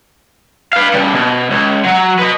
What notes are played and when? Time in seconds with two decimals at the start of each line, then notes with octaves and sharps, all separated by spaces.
0.73 B4 F5
0.94 C#3 G3
1.14 B2
1.50 C#2
1.84 F#3
2.19 B4 D#5